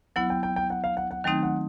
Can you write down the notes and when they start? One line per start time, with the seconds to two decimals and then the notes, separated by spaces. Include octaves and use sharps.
0.16 F#3 B3 E4 F#5
0.30 G5
0.43 G5
0.56 G5
0.70 F#5
0.84 F5
0.97 F#5
1.11 F#5
1.24 D#3 F#3 A3 C4 D#4 G5
1.43 F#5